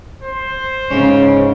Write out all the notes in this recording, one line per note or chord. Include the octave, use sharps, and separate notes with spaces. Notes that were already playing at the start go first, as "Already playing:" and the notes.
C5
G#2 C#3 C#4